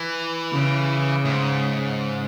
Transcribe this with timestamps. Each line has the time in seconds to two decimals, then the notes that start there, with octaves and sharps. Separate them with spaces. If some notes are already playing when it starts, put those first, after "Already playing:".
Already playing: E3
0.52 C#3
1.25 A2
1.31 G#2